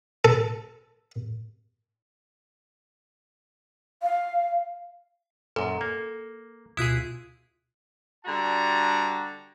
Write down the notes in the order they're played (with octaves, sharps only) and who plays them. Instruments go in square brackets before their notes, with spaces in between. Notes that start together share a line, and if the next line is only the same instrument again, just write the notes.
[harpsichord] A4
[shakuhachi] F5
[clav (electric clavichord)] F#2 A#2 [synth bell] A4
[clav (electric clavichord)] A#3
[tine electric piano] D2 B2 F4 [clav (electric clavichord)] E4 G#4 [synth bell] D#6 F#6 B6
[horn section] D3 G3 F#4 A5 A#5